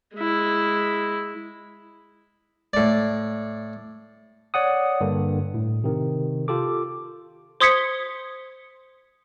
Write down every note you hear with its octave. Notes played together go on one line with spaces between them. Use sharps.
G#3 E4
A2 D5
C#5 D5 F#5 D#6
G2 D3 A#3
A2
C3 D#3
F4 G4 A4 D6
C5 C6 D#6 G#6 B6 C#7